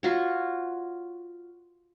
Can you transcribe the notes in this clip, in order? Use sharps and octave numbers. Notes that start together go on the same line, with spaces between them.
F4 F#4 C#5